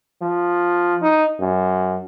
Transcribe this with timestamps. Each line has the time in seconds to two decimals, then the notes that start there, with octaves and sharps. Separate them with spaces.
0.22 F3
1.02 D#4
1.41 F#2